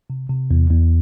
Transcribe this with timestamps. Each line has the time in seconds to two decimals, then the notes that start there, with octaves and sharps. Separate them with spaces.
0.10 C3
0.30 C3
0.51 E2
0.70 E2